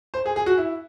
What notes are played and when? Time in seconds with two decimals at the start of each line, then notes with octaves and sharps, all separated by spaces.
0.14 C5
0.26 G#4
0.36 G#4
0.46 F#4
0.57 E4